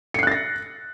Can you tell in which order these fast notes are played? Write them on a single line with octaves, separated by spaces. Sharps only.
C#7 C7 F#6 A6 A#6